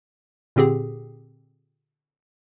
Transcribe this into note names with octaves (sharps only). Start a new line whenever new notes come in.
A#2 D3 C4 G4 G#4